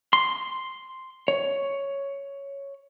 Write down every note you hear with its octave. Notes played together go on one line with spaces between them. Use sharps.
C6
C#5